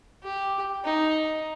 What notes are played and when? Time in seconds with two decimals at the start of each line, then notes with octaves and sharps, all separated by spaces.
0.23 G4
0.84 D#4